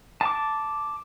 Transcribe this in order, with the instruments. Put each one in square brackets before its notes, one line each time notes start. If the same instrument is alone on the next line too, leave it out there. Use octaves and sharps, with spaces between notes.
[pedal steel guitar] A5 D6